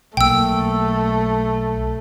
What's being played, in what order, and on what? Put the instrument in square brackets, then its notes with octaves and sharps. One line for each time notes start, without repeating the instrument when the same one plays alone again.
[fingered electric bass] B1 A#3 [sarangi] A3 [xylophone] G5 E6